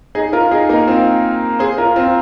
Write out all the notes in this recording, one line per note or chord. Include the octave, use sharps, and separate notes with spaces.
D#4 G#4
F4 A#4
D#4 G#4
A#3 D#4
C4 F4
G#4 C5
F4 A#4
C4 F4